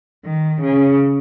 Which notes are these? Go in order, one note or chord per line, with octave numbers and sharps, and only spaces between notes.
D#3
C#3